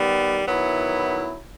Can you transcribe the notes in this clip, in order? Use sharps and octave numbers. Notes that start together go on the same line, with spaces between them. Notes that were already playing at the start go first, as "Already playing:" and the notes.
Already playing: D#3 G3 B3
D#3 F#3 B3 E4